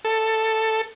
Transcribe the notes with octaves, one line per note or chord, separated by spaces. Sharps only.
A4